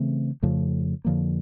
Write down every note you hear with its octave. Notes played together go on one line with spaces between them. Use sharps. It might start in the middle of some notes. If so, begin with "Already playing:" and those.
Already playing: C#3 E3 A3 C4
F2 C#3 F3 A3
F2 D3 F3 A#3